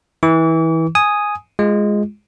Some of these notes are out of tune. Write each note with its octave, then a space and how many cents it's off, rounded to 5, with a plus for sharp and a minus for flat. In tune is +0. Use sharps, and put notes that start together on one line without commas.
E3 -25 D6 -45
G#5 +0 D#6 +0
G#3 +0 F4 +0